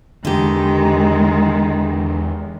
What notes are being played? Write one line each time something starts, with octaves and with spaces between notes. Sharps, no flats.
E2 D3 D#3 G#3 G4